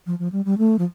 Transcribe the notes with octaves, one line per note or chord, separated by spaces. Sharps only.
F3
F3
G3
G3
A3
F3